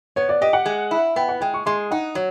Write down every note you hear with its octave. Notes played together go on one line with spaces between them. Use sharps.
B3 C#5
D5
G4 D#5
F#5
G#3
E4
B3 G5
F#5
G#3 G5
C#6
G#3 C6
D#4 F#5
F#3 C#5